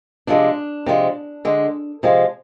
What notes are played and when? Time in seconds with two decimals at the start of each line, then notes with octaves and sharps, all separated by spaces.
0.27 C3 F3 G#3 D4
0.86 C3 F3 G#3
1.45 D3 G#3
2.03 C3 F3 G#3